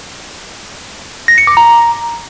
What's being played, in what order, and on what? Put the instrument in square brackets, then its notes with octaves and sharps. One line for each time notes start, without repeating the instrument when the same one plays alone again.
[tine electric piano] A#6
C#7
D6
A#5